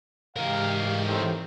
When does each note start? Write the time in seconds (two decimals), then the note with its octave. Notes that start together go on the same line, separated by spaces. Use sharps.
0.37 G#2 E3 G4 A#4 F5
1.07 A2 D#3 C4